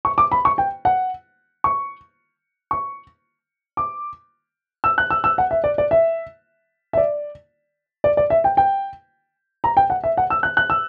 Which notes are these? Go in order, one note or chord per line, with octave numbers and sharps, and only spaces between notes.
C#6
D6
B5
C#6
G5
F#5
C#6
C#6
D6
E6
F#6
E6
E6
F#5
E5
D5
D5
E5
E5
D5
D5
D5
E5
G5
G5
A#5
G5
F#5
E5
F#5
E6
F#6
F#6
E6